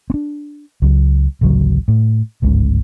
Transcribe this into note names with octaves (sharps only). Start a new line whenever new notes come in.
C4 D4
C#2 F#3
A1 D2 C#3 F#3
A2
G1 C#2 G#2 C#3